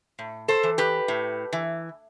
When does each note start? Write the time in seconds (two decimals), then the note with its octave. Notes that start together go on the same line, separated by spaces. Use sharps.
0.19 A2
0.48 A4 C5
0.63 E3
0.78 G4 B4
1.08 A2
1.53 E3